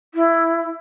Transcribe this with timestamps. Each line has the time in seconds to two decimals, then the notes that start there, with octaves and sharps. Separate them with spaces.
0.15 E4